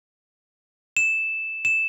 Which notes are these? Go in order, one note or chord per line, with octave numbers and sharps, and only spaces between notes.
E7
E7